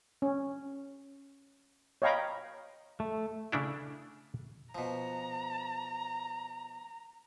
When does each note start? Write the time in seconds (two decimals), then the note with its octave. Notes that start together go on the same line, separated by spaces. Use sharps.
0.22 C#4
2.02 C#5 D#5 F5 G5 A#5 B5
3.00 A3
3.52 C#3 A3 D4 E4
4.75 B2 F3 A#5